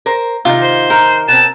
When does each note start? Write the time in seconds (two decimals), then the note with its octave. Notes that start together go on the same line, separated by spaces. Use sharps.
0.06 A#4 C5
0.45 C3 D#3 D#4 F4
0.62 C5
0.90 A#4 G6
1.28 B2 C4 A5 E7